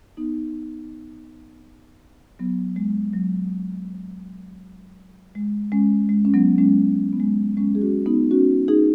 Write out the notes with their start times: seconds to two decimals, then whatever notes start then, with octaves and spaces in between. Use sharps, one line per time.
0.17 B3 D#4
2.39 F#3 B3
2.76 G#3
3.13 F#3
5.35 G#3
5.72 G#3 C#4
6.09 G#3
6.25 C#4
6.34 F#3 B3
6.58 G#3 C#4
7.13 B3
7.20 G#3
7.57 G#3 C#4
7.75 G#4
7.81 C#4 F#4
8.06 B3 D#4
8.31 C#4 F#4
8.68 D#4 G#4